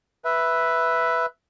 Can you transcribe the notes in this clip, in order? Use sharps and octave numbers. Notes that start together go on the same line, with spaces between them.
B4 E5